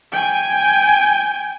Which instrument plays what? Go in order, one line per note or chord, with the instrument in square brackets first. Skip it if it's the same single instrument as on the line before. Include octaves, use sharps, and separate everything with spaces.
[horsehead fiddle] G5 G#5